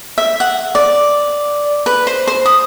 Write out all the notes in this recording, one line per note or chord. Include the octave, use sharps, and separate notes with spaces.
E5
F#5
D5
B4
C5
C5
D#6